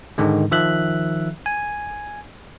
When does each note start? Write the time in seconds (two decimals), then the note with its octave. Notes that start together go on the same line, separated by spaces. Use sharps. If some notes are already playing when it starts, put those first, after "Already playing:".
0.18 G#2 D3 D#3 G#3
0.51 D#3 F3 E5 F#6
1.46 G#5